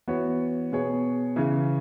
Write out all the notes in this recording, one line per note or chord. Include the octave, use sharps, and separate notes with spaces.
E3 B3 F#4 C#5
B2 B3 G#4 C#5
C#3 E3 C#4